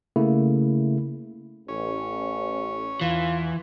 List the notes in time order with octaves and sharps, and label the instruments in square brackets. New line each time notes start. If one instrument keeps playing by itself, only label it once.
[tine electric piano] C#3 A3 A#3 E4
[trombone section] A1 [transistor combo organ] C#4 C#5
[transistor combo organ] E2 [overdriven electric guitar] E3 [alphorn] F4